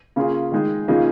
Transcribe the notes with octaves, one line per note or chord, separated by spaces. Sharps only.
C#3 A#3 F4 G#4
D#3 G#3 D#4 G#4
C#3 F3 A#3 D#4 G#4